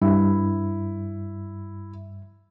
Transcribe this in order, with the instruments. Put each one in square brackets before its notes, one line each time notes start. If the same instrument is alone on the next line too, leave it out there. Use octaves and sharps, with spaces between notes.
[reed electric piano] G2 [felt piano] E4